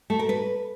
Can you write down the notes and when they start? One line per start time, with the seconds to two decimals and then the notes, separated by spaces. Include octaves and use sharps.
0.10 A3
0.19 A#4
0.29 B4